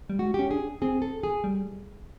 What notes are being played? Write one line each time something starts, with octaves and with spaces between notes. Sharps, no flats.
G3
G#3 F#4
C#4 G4
D4 G#4
C4 G#4
A4
G#4
G3